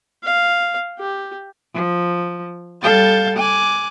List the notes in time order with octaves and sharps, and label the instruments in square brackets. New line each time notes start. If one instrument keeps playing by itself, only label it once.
[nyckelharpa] F5
G4
[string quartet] F3
G3 A4 F5 G6 A6
G#5 D6 F#6